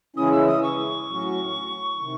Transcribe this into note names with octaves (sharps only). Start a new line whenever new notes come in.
C#3 E3 G#3 C#4 E4 D#6
E6
D#6
C#6
A2 F#3 C#4 F#4
C3 D#3